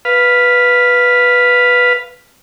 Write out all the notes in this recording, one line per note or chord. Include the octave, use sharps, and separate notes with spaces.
B4 F5